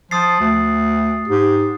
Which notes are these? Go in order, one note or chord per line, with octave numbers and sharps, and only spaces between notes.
F3 D#6 A6 C7
D2
G#2 G4